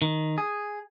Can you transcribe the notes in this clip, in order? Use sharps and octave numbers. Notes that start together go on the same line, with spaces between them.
D#3
G#4